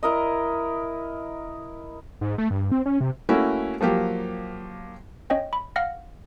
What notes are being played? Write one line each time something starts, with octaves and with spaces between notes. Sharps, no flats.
E4 A#4 D#5
G#2
A3
G2
C4
C#4
C3
A3 A#3 C#4 E4 F#4
F3 F#3 A#3 G4
C#4 C#5 D#5 G5
B5
F5 F#5 F6 A#6